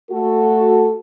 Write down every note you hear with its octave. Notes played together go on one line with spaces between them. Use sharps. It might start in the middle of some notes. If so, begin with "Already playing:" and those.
A3 F#4 A4